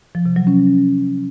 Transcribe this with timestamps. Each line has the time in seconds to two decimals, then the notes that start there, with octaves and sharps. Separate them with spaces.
0.15 F3
0.26 C3
0.36 F#3
0.47 C#4